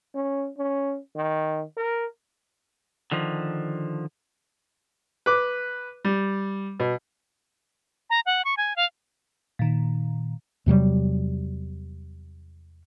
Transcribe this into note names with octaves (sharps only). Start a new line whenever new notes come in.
C#4
C#4
D#3
A#4
D3 D#3 F3
B4 D6
G3
B2
A#5
F#5
C#6
G#5
F5
A#2 D#3
E2 C3 F#3 G3